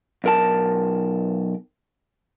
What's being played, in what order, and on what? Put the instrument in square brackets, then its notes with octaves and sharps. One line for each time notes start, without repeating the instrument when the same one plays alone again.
[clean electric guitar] B1 A#4 A5